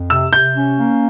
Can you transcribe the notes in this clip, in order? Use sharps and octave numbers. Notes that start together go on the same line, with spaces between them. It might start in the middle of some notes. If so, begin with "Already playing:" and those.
Already playing: F2
C3 E6
C3 G6
C#4
A#3